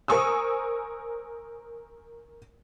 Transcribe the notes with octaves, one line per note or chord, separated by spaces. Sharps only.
A#4 C5 G#5 C#6 D#6 E6